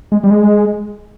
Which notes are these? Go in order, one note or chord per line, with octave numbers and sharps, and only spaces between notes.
G#3
G3
G#3